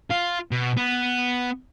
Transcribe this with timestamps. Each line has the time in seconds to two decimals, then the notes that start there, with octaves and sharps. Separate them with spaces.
0.10 F4
0.51 B2
0.77 B3